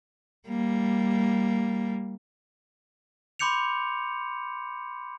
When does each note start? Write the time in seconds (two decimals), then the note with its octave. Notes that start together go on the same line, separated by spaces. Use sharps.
0.48 G3 A#3
3.39 B5 C6 D6 G6 C#7 F7